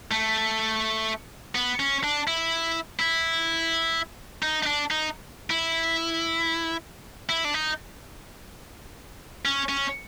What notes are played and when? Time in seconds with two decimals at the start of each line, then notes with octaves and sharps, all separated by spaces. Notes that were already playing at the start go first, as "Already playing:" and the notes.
0.11 A3
1.55 B3
1.80 C#4
2.04 D4
2.27 E4
2.99 E4
4.43 D#4
4.63 D#4
4.66 D4
4.91 D#4
5.50 E4
7.29 E4
7.45 D4
7.54 D#4
9.45 C#4
9.69 C#4